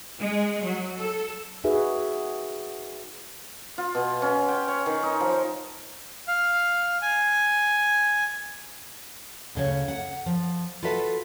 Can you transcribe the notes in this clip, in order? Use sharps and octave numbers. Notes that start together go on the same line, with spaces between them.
G#3
F#3
A4
D#4 F#4 G#4 B4 E5
F4
B2
C#4
G5
C#5
D#3
D#4
F3
F5
G#5
D2 C#3 C#5
F#5
F3
F4 F#4 A4 B4 E5